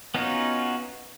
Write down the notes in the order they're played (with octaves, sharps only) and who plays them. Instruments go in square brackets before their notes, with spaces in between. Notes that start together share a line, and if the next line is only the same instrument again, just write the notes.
[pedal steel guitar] B3 C#4 D#4 F4 F#4